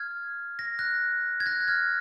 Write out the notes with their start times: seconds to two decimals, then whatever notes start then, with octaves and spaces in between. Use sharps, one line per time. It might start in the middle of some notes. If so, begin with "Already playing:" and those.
Already playing: F6 G#6
0.59 A#6
0.79 F#6 A#6
1.40 G#6
1.46 F#6 A#6
1.61 F#6
1.68 F6 G#6